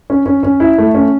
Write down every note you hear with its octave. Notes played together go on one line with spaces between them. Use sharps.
C#4
C#4
C#4
E4
A3
C#4